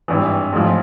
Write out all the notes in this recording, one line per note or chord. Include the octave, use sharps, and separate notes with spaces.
G#1 G2 E3
A1 G#2 F3